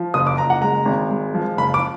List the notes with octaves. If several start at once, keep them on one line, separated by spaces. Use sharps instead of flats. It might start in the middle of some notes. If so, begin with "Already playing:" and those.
Already playing: F3
F#1 D#6
D6
F#1 A#5
F#5
G#3 A#5
G#1
G#3
F3
F#1 B5
D6